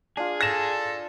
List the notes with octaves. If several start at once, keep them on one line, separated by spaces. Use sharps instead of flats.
D4 F4 G#4
A4 A#6 E7